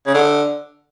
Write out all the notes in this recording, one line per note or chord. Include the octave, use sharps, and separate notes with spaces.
C#3
D3